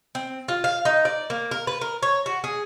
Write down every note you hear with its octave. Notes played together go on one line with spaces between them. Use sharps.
C4
F4
F5
D#4
D5
A#3
A#4
B4
A#4
C#5
F#4
G#4